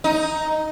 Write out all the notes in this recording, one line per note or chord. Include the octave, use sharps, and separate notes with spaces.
D#4